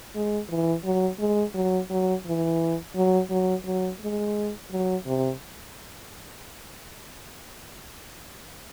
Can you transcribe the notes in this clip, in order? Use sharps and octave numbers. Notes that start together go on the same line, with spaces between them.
G#3
E3
F#3
G#3
F#3
F#3
E3
F#3
F#3
F#3
G#3
F#3
C3